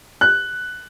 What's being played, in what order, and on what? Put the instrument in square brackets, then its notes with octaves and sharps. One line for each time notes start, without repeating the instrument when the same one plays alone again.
[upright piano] F#6